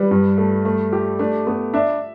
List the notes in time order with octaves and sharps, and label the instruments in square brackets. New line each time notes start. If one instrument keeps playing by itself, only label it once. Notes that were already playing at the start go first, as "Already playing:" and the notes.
Already playing: [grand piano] G3 [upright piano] B4
[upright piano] G2
A3
A3
G4
[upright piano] A3 [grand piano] D4
[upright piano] A3 [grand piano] B3
[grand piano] D4 [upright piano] E5